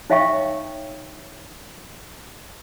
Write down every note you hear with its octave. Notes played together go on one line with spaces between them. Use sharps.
D#4 C#5 E5 F5 G5 C#6